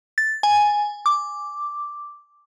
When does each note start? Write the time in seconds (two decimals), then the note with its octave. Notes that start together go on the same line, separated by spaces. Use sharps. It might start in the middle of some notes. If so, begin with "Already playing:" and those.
0.18 A6
0.43 G#5
1.06 D6